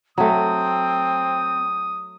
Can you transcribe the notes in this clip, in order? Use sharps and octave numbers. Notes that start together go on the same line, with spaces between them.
F#3 A3 C4 D#6